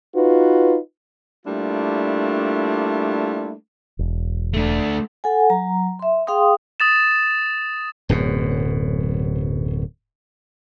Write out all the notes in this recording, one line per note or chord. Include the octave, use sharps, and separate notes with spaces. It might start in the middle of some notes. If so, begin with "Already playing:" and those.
D#4 F4 F#4 B4
G3 A3 A#3 D4 E4 F4
E1
A3 D4
A4 F#5 G#5
F#3 A#5
E5 C6
G#4 F5 G5 C6 D#6
D#6 A6 E7
D1 F#2 B2